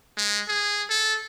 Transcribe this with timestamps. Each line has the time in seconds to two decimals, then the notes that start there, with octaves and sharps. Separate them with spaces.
0.17 G#3
0.48 G#4
0.90 A4